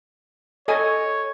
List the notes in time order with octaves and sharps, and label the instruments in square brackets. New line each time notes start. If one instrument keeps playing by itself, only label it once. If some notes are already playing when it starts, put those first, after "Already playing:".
[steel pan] A4 D#5 G#5 [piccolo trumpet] C#5